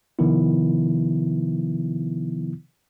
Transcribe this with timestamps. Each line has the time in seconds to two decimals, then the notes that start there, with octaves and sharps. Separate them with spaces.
0.19 C3 D#3 F3 B3 E4